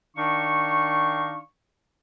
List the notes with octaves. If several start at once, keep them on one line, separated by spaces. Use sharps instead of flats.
D#3 D4 D#4 F5 C#6